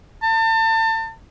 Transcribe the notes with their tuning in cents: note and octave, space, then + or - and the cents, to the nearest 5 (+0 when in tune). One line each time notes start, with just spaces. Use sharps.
A5 +35